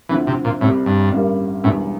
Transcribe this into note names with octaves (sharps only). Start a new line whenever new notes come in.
D2 D3 E3 F3 C4 E4
C3
A#2
C2 A2 C3 G3
G2
A1 G2 D3 G3 A#3
E1 E2 A2 D3 G3